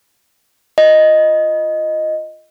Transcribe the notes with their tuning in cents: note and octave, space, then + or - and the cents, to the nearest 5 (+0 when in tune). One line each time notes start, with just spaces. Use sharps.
F4 +0 D#5 +0